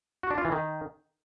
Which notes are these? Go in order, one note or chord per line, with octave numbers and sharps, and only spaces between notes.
F#4
D4
F4
E3
D#3